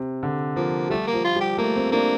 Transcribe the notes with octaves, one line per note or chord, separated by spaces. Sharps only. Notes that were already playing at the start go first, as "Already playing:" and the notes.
Already playing: C3
D3
F3 A#3
G3 A3
A#3
F3
F4
G3
G4
A3 A#3
C4
A#3 D4